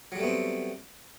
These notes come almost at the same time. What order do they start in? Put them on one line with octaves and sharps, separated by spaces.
F#3 G3 A3 B3 C4